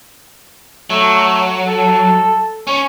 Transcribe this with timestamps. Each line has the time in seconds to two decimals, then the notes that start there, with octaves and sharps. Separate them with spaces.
0.90 F#3 A3
1.67 A4
2.67 C#4 C#5